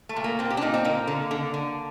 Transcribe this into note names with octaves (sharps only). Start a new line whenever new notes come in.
A3
A#2
A#3
A#2 C4
G4
D4
A#2 D#4
C4
D3 A#3
D3
D3
D3